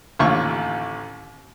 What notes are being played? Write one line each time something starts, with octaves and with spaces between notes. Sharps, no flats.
A1 D#2 D3 F4 C#6